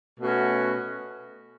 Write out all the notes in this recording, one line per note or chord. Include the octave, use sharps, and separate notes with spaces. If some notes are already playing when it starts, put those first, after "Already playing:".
B2 A3 C#4 F#4